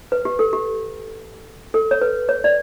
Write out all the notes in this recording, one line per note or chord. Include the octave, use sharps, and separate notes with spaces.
B4
G4
A4
G4
A4
C#5
B4
C#5
D5